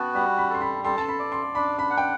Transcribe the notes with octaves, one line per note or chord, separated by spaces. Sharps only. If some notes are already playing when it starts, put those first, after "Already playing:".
Already playing: B3 F#4 G5 A5
G3 B5
B5
A4 C6
B5
A4 C6
A5
B5
D5
C6
D4 B5
B5
F#5
G5